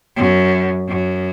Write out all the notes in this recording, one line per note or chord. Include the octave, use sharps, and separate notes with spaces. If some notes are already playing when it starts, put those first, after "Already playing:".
F#2
F#2